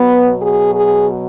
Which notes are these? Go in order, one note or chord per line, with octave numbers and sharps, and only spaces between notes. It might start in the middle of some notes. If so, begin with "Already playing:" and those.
Already playing: B2 F#3 B3
G#4
G#4